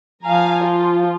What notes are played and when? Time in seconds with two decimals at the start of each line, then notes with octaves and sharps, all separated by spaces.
0.23 F3 F5 G#5 A#5
0.63 F4